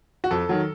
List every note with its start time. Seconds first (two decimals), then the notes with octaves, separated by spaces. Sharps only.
0.24 F#4
0.31 F2 A4
0.49 D#3 F#3